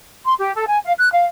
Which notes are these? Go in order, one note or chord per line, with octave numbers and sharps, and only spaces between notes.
C6
G4
A4
G#5
F5
F#6
F5